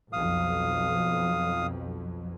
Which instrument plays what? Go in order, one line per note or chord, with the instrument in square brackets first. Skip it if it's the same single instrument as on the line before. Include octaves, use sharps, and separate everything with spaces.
[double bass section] B1 F2 [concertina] F5 D#6